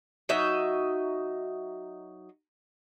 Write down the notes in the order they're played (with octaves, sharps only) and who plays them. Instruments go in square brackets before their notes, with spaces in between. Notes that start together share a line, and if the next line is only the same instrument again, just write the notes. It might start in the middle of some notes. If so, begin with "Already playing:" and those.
[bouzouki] F#3 D#4 D#5 E5